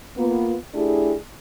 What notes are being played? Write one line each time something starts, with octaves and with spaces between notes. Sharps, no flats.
A#3 B3 F4
A3 D4 E4 G4 G#4